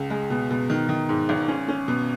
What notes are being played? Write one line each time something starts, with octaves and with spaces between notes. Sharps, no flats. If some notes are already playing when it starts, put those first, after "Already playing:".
Already playing: C#2
G#3
B2
B2
D#3
D#3
G#2
G#1
C#4
C#4
B2